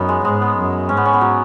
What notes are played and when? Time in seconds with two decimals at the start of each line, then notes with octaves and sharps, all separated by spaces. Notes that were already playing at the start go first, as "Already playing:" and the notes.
Already playing: F#2 B3 C#4 D#4
0.09 G#3
0.25 G#2 G#3
0.41 B3
0.57 F#2
0.89 G#2 C#4
0.97 B3
1.05 C#4
1.13 B3
1.21 F#3